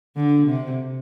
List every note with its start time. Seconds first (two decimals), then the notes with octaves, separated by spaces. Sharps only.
0.16 D3
0.47 C3